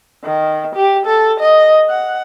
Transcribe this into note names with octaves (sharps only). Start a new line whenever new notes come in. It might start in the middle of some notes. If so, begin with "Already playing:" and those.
D#3
G4
A4
D#5
F#5